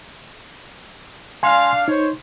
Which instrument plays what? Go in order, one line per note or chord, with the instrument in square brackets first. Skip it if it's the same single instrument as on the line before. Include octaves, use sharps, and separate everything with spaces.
[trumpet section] D4 F5 [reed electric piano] G#5 C6
[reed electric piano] D#4 [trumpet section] C5 C#5